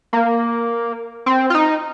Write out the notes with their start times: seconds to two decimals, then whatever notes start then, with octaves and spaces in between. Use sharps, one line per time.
0.13 A#3
1.26 C4
1.50 F4
1.55 D#4